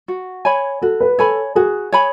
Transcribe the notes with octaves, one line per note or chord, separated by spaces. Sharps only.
F#4
C#5 G#5 B5
F#4 A4
B4
A4 C#5 G#5 B5
F#4 G#4
C#5 G#5 B5